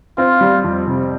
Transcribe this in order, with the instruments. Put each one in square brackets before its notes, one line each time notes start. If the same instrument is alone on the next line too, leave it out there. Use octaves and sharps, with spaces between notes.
[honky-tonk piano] C4 [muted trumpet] F4
[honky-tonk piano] G3
F2
C3